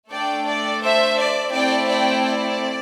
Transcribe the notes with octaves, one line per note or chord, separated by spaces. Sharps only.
A3 D4 A4 D5 G5
D5
C5 E5
D5
A3 C4 E4 D5 G5
D5 G5
D5